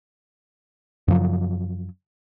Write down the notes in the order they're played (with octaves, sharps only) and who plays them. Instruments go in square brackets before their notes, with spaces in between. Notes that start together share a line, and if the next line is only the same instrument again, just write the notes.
[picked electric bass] F#2 C#3 F3 F#3